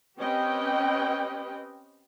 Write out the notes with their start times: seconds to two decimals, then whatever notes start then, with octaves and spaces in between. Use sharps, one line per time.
0.18 C4 C#4 G4 B4 D#5 G5